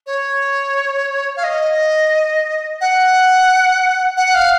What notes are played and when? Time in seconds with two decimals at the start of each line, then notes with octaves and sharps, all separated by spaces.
0.06 C#5
1.36 F5
1.44 D#5
2.81 F#5
4.17 F#5
4.35 F5